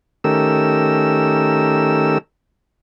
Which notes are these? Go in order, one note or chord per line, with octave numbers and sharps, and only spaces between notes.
D#3 A3 C#4 G4 A#4 E6